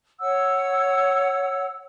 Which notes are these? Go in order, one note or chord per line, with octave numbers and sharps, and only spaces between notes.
C#5 F#5 E6